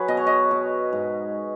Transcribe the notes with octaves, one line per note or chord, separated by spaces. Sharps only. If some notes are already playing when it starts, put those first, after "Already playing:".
Already playing: F#3 G#4 B4
B2 D#5
C#5
D#5
B2
G#2